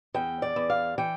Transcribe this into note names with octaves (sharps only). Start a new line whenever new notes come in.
E2 G5
D5
E2
F5
E3 G5